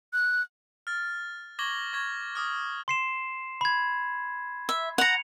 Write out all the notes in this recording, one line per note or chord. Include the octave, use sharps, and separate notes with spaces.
F#6
F6 A6
C#6 D6 G#6 A#6 F#7 G7
C#6 G#6 A#6
D6 D#6 F6
C6 C7 E7
B5 G#6
E5
F#5 A#5 C#7 F7